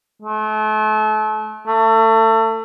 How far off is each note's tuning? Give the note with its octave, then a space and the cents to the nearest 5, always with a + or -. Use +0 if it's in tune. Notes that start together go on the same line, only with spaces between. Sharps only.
A3 -35
A3 +30